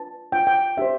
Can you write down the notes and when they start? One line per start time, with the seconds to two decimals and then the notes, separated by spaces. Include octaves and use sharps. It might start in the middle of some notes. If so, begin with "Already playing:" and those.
Already playing: D4 F4 B4 A5
0.32 D4 F4 B4 G5
0.47 G5
0.77 D4 G4 C5 E5